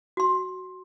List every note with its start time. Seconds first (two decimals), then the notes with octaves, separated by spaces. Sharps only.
0.17 F#4 C6